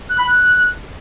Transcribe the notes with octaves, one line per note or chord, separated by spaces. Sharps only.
F#6
B5
F#6